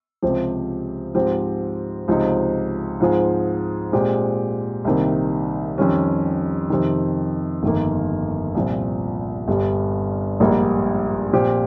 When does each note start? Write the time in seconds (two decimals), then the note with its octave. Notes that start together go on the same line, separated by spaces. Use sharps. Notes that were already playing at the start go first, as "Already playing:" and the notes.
0.22 C#2 C3 F3 C4 G4
1.15 G#2 F3 C4 G4
2.08 C#2 C3 F3 C4 D#4
3.00 G#2 F3 C4 F4 G#4
3.92 A#2 G#3 C4 G4
4.85 C2 C3 D#3 A#3
5.78 F2 D#3 G3 C#4
6.70 F2 C3 D#3
7.63 G1 F2 D#3 A#3
8.54 C2 A#2 F3
9.48 G1 G2 G3
10.40 A#1 G#2 G3 A#3 D#4
11.33 A#2 F3 C4 G4